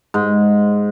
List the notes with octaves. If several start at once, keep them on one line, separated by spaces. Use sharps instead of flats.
G#2